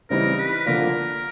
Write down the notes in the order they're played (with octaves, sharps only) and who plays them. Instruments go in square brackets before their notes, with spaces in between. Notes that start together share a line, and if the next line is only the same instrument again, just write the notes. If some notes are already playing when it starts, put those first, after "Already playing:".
[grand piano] C#3 E3 G3 C4 D#4 [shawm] A#4
[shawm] B4
[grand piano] D3 F3 A#3 D4 F4 [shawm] A#4